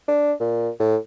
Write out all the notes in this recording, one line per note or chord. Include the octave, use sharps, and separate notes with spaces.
D4
A#2
A2